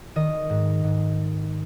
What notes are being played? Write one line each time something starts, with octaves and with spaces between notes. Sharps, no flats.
D#3 D#5
G#2
G#2